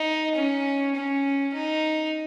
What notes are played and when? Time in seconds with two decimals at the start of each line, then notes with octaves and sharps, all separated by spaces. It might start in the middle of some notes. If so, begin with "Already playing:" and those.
Already playing: D#4
0.35 C#4
0.95 C#4
1.54 D#4